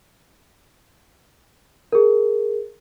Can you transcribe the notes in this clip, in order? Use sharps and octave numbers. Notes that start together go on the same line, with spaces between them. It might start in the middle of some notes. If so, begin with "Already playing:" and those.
G#4 A#4